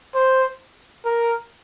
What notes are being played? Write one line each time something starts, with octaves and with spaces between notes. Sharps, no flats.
C5
A#4